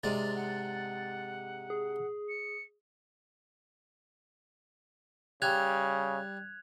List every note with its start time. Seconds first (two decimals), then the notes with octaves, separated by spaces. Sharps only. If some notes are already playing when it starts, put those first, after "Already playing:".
0.03 G#2 C3 D4 A6
0.35 F#5
1.70 G#4
2.29 C#7
5.42 C#3 G3 F#6 G#6 F7